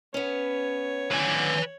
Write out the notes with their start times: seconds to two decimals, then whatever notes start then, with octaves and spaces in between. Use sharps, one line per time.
0.14 B3 C#4 C#5
1.11 A2 D3 B4 G#5